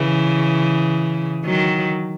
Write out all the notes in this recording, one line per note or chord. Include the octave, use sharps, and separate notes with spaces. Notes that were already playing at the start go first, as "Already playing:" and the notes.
Already playing: C#3 E3
D#3 F#3